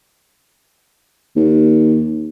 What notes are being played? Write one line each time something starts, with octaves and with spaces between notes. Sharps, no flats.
D#2